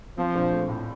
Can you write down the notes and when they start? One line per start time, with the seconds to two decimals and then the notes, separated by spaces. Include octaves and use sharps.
0.17 F3 C4
0.35 A#1
0.52 A3
0.69 A2